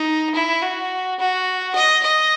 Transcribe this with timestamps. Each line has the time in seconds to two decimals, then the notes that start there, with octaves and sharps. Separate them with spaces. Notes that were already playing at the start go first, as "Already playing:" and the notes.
Already playing: D#4
0.34 E4
0.62 F#4
1.19 F#4
1.75 D#5
2.03 D#5